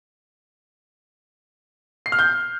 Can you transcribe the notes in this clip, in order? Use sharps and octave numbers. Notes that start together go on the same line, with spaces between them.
C7
F6
G6